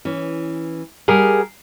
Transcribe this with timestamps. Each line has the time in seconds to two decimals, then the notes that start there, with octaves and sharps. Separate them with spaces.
0.05 E3 C#4
1.08 G3 G4 G#4 A#4 F#5